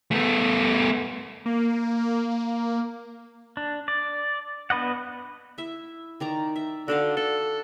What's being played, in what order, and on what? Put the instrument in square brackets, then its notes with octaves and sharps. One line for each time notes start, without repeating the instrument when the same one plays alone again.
[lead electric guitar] A3 B3
[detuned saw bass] A#3
[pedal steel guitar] D4
D5
B3 D4 B4 D#5 F#5
[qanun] E4 E5
D#3 D5 A#5
E5
[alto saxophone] D3 [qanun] F#4 A4 F5
[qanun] D4 [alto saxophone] A4